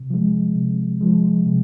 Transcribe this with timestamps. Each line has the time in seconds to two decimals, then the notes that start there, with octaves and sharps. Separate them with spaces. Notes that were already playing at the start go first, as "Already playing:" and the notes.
Already playing: C3
0.10 F3 G#3
0.55 C3
1.01 F3 G#3
1.46 C3